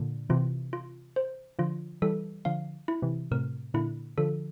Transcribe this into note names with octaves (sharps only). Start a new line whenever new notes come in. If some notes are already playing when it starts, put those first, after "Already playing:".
Already playing: A#2 D3
C3 E3 F4
F4
C5
D3 F3 F4
E3 G3 A4
D3 F3 F5
E4
C3 E3
A2 C3 A#4
A#2 D3 E4
D3 F3 A4